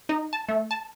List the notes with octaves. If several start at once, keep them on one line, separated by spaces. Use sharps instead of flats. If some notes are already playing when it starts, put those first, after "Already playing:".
D#4
A5
A3
A5